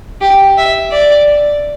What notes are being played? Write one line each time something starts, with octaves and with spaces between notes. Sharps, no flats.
G4
E5
D5